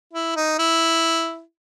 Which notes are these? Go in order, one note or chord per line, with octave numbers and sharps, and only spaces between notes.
E4
D#4
E4